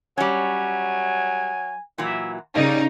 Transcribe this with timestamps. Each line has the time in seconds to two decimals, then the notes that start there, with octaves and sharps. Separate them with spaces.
0.18 F#3 G3 C#4 G#5
1.98 A#2 E3 F#3 E5
2.55 C#3 G3 A#3 D#4 D5